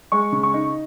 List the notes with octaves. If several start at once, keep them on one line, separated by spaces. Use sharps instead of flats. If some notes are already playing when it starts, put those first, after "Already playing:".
G#3 C#6
C#3
C#6
D#4